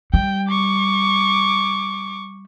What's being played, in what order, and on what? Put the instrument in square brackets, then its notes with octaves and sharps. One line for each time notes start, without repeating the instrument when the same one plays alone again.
[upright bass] G3 [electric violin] G5
[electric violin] C#6 D6